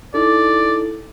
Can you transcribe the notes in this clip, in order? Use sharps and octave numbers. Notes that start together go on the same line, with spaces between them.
D#4 E4 A4 D5